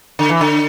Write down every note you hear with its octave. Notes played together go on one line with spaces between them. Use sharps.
D3
E3
D3